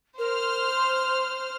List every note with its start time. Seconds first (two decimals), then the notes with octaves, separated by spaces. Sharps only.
0.18 A#4 C5 F6
0.76 C6